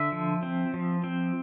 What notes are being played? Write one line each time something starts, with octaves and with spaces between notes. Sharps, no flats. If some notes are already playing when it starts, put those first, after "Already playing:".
Already playing: D3 E5
F3
C4
F3
C4